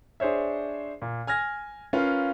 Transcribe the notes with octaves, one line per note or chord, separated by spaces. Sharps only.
D4 G#4 C5 C#5 E5
A#2
G#5 F6 G#6 A#6
C#4 F4 A#4 B4 F5